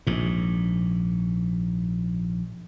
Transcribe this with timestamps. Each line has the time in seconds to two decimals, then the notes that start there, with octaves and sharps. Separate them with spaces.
0.07 A#1 G#2